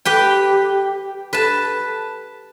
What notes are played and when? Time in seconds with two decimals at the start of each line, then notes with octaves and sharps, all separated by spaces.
0.05 G4 B4 G5
1.33 B4 A5